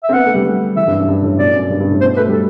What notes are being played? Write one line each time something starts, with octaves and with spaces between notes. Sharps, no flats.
E5
C4
B3 F#5
A3
G3
G3
E3 E5
G2
F#2
G2
A2
B2 D5
F#2
G2
G2
A2
B2 C5
A3 B4
G3 A4